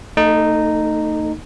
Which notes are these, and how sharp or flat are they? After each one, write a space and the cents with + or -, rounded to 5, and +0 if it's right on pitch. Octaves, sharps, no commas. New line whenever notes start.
A3 +40 D#4 -10 A4 +0